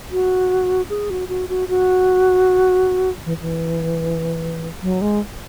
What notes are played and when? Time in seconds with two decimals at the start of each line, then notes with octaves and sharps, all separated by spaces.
0.12 F#4
0.90 G#4
1.10 F#4
1.29 F#4
1.49 F#4
1.69 F#4
3.25 E3
3.41 E3
4.82 F#3
5.01 G#3